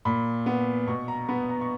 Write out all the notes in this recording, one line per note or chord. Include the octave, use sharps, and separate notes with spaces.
A#2 B5
B3
B2 C#6
A#5
B3 B5
A#5
C#6